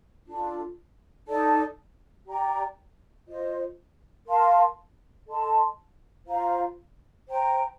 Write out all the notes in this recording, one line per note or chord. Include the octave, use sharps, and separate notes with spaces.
D4 F4 A4
D#4 A4 D5 A5
G4 D5 G5 A#5
F4 C5 D#5
A#4 F5 A5 C6
A4 D#5 A5 C6
F4 C5 F5 A#5
C5 G5 A#5